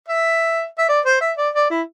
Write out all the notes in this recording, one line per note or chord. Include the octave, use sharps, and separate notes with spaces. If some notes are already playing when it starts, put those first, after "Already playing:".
E5
E5
D5
C5
E5
D5
D5
E4